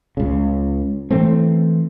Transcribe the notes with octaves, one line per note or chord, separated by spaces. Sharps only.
C#2 C#3
E3 A3 C4